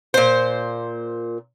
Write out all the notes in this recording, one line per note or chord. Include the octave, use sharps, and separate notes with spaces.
A#2 C5